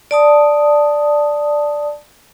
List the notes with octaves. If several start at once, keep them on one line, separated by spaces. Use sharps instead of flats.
D5 A5 D#6